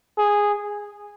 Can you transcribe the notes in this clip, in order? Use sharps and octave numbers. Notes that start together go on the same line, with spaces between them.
G#4